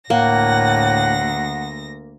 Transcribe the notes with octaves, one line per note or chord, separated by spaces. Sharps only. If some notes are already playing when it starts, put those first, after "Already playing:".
D2 A2 A#3 F#5 A#6